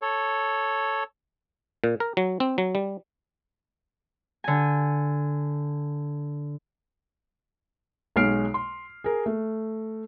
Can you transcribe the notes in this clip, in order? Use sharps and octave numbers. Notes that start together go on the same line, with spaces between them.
A4 C#5
A#2
A#4
F#3
C4
F#3
G3
D3 G#5
B1 G#3 C#5 F6 C7 D7
C6
G#4 A#4
A3